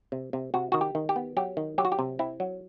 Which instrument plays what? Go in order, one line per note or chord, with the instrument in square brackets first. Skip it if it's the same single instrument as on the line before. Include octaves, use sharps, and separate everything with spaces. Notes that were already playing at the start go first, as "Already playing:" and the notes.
[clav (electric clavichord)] C3
C3
C3 F#4
D#3 F#4
G4
D#3
G4
B3
F#3 G4
D#3
F#3 G4
F#4
G4
C3
C4 E4
F#3